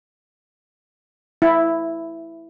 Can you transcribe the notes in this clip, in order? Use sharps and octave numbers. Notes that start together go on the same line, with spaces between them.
E4